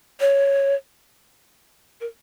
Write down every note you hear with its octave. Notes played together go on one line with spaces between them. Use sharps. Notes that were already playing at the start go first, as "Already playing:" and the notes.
C#5
A#4